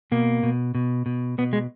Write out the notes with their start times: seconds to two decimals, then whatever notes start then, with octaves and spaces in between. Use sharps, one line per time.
0.12 B2 A#3
0.43 B2
0.75 B2
1.06 B2
1.38 B2 B3
1.53 G#3